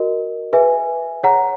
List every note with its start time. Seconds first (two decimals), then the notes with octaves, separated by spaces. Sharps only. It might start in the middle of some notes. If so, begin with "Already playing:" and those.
Already playing: F#4 A#4 D#5
0.53 G#4 B4 E5 G#5
1.23 G#4 C#5 F#5 A#5